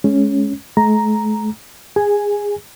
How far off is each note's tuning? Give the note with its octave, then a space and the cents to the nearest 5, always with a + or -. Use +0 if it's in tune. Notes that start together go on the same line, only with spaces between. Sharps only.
G#3 +20 C#4 +0
A3 -45 A#5 +0
G#4 -20 G#5 +0